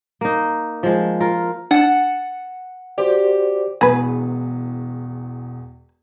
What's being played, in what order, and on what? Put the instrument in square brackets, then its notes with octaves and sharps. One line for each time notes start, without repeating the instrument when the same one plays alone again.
[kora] A#3 D#4
F3 G#3
F4 A#4
[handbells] D4 [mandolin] F#5 A5
[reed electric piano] F#4 C5 D5 [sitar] G4
[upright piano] E1 E2 [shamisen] G#4 B4